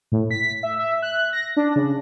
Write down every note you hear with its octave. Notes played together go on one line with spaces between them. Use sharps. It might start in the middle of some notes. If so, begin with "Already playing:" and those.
A2
B6
E5
E5
F#6
A#6
D4
C#3